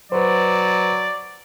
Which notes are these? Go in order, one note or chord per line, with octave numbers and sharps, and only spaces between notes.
F#3 B4 C5 D5